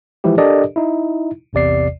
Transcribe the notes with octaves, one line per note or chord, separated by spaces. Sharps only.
E3 F3 G#3 E4 G4
D4 G4 A4 A#4 D5 D#5
D#4 E4
A1 E2 C3 D5 C7